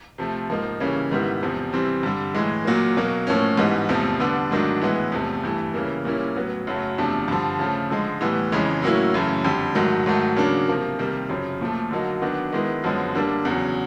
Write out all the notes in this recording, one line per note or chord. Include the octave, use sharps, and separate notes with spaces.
C3 F3 A3
G#2 F3 A#3 D#4
C#3 E3 G3 A#3 C#4
G#2 D#3 G3 B3 E4
E2 C3 F3
C3 E3 G3 C4
G2 D3 G3
A2 E3 G#3
A#2 F#3 A#3
B2 F#3 A#3
A2 F3 A#3 C#4
G#2 E3 G3 B3 D#4
E2 C3 F3 A3
D3 G3 B3 D4
G#2 D#3 F#3 A3 D4
A2 E3 G#3 B3 E4
E2 C3 F3 A3
G2 E3 A3
C#3 E3 G3 A#3
A#2 G3 A#3 C#4 E4
A2 F#3 B3
F#2 C#3 F#3 A3
E2 C3 F3 A3 D4
G2 D3 F3
C#3 F3 A3
D3 F3 G#3
A2 E3 G3 B3
F2 C#3 E3 G#3
A2 F#3 A#3 C#4 E4
F#2 C#3 E3 A3
F2 D3 G3
G#2 D#3 F#3 A3
G#2 D#3 F#3 A3
C#3 F#3 A#3 D4
C3 F3 A#3
C3 D#3 G3 A#3
F#2 C#3 F3
A#2 F3 A3
D3 F#3 A#3 D#4
D#3 F#3 B3 D4
D#3 G#3 B3 E4
F#2 D3 F3 G#3 B3
D3 G3 A#3 D4
E2 C#3 F#3